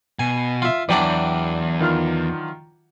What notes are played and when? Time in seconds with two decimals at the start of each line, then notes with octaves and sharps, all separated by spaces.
0.19 B2 G#5
0.62 F4 E5
0.89 E2 E3 F#3 D4 D5 G5
1.80 D#3 F4 F6